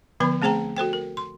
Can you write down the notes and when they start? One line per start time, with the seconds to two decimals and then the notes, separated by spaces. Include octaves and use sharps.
0.20 D3 F3 B3 B4 B5
0.42 A3 C4 G#4 C5 G5 A#5
0.77 F#4 A4 C5 G5
0.93 A#4
1.17 C6